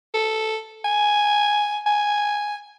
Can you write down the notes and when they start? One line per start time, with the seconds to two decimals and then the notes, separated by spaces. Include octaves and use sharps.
0.14 A4
0.84 G#5
1.86 G#5